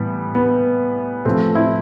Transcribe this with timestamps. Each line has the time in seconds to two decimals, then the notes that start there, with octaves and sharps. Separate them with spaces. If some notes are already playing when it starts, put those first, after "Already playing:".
Already playing: A2 E3 G3 B3
0.35 B3
1.25 A2 F3 A3 C4
1.55 C4 E4